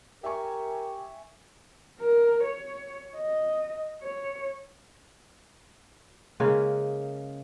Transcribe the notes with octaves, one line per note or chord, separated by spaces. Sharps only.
G4 A#4 E5 G#5 C#6
A#4
C#5
D#5
C#5
C#3 G#3 A#3 C#4